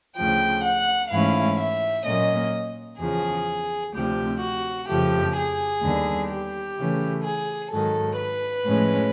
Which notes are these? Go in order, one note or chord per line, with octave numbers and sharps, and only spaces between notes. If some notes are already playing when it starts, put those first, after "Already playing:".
D2 C#3 F3 G5
F#5
G#2 E3 A3 C#4 E4 F5
E5
A#2 F#3 A#3 C#4 D#5
E2 C#3 F3 G#4
D2 C3 F3 G4
F#4
F2 C#3 F3 A3 G4
G#4
D#2 D3 G3 B3 D4
G4
C#3 E3 A3 C#4
G#4
G#2 D#3 F#3 A4
B4
A2 F3 G#3 C#4